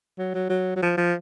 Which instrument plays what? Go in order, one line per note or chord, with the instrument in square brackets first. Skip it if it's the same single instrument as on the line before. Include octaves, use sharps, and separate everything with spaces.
[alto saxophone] F#3
F#3
F#3
F#3
F3
F3